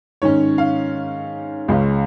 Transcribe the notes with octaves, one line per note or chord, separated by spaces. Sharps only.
G#2 D#3 C#4 C#5
F5
C#2 C#3 G#3 C#4